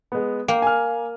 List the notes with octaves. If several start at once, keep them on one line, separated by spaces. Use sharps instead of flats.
G#3 B3
A#3 F5 G5
G#5 F6